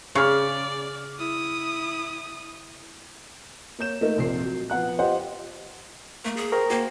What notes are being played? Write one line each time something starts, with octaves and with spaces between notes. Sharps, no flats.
C#3 D5 C#6 F6
E4 D#6
A#3 C#5 G6 E7
A3 A#3 D#4 A#4
F1 A#1 A#2 C7
F#3
F3 B3 F#5 F#6
F4 G4 C5 D#5 F#5
A3 A#3
G#4
A#4 C5 G5 C#6
A#3 F#4 C5 G5